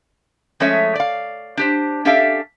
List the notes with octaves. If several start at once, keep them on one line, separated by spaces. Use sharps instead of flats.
F3 G#3 A3 C#4 C#5 E5
D5 F5
D4 G4 C5
C#4 D4 G4 A4 E5 F5